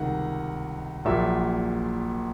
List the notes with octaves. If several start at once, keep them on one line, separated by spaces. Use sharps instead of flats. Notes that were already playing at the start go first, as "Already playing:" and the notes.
Already playing: C#2 C3 D#3 G3 F#5
A#1 A#2 F#3 E5